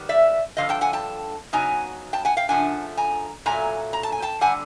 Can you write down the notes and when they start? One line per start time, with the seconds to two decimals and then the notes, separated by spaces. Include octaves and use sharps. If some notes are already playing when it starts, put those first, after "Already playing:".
Already playing: D#3 G3 B3
0.09 D5 E5
0.57 G2 D3 F3 D#5 F5
0.69 G5 A5
0.81 F#5 G#5
0.93 G5 A5
1.53 C#3 F#3 B3 D#4 G#5 A#5
2.13 G5 A5
2.25 F#5 G#5
2.37 F5 G5
2.49 C#3 F3 A3 D4 F#5 G#5
2.97 G#5 A#5
3.46 A#2 F#3 A3 G#5 A#5
3.93 A#5
4.03 A5
4.12 G#5
4.22 G5 A5
4.41 D3 G3 F#5 G#5